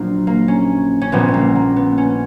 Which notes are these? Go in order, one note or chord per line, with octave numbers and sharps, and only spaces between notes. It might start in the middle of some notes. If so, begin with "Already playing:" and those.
Already playing: A#1 A#2 F#3 A#3 D4
A#3
C#4
C#4
A#1 A#2 G3 B3
B3
A#3
A#3
B3
C#4